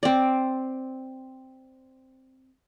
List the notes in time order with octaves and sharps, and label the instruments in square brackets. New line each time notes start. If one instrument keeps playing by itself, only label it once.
[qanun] C4 D5